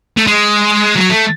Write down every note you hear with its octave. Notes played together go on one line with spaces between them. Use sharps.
A3
G#3
F#3
A3